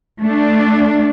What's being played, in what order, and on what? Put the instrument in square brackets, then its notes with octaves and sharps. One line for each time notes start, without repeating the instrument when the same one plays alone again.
[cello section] A3 D4